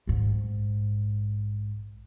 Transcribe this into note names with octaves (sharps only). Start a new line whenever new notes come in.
A#1 G#2